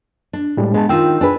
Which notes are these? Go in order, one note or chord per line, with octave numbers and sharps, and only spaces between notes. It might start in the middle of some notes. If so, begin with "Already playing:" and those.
D4
A2 G3 G#3
G#3 B3 A5
D#3 F4 G5 E6
D4 G#4 B4